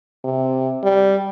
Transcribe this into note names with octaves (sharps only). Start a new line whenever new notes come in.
C3
G3